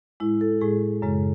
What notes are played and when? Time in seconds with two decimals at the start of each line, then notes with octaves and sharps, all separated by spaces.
0.20 A2 G#3 E4
0.41 A4
0.61 A2 G#3 G#4
1.02 F#2 C#3 G#3